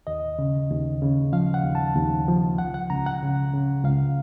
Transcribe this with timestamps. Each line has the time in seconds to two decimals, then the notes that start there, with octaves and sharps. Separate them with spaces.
0.07 D#2 D#5
0.39 C#3
0.70 D#2
1.02 C#3
1.33 F3 F5
1.54 F#5
1.64 D#2
1.75 A5
1.96 D#2
2.28 F3
2.58 C#2 F#5
2.74 F#5
2.90 C#2 A#5
3.06 F#5
3.22 C#3
3.53 C#3
3.84 C#2 F5